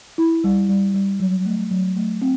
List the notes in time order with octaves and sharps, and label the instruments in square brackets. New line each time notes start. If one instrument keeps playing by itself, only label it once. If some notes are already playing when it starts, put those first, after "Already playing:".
[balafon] E4
G3
G3
G3
F#3
A3
F#3
A3
C4